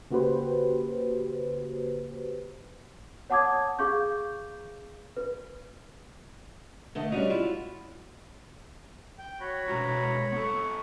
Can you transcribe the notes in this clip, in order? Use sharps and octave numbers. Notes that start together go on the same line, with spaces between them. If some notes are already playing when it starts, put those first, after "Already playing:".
C#3 A#3 F#4 G4 B4 C5
C#5 F#5 A5 D6 D#6 G#6
G#4 F5 C#6 D6 G6
B4
D3 A3 D#5
G3 C#4 D#4 F#4
E4 F4
G5
F#4 C#5 B5
B2 G#3 F#4 A#5
B3 A4 C#6